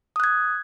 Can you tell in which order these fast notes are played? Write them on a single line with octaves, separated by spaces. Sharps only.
D#6 F#6 G#6